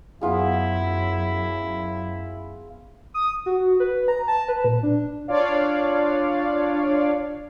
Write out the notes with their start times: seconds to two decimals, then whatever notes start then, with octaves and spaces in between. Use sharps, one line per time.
0.21 F#2 B3 E4 F4 G#4
3.14 D#6
3.46 F#4
3.80 B4
4.08 A#5
4.28 A5
4.48 B4
4.64 A#2
4.83 D4
5.28 D4 F4 C#5 D5 F5